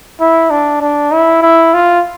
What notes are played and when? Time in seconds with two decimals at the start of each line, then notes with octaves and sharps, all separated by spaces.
0.21 E4
0.51 D4
0.82 D4
1.12 E4
1.42 E4
1.74 F4